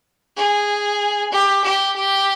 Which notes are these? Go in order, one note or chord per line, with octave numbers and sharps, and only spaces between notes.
G#4
G4
G4
G4